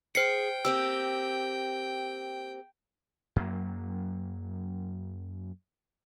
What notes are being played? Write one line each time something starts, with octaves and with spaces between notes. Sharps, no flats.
G#4 C5 G5 C7 C#7
A#3 C4 G4 E6
F#2 F#3 A#3